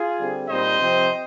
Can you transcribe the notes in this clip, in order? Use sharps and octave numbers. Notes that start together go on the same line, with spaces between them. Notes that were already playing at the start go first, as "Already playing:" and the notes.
Already playing: F4 G#4
D3 G3 C4
A#2 G3 C4 D#4 C5 D#5
C3 F3 C4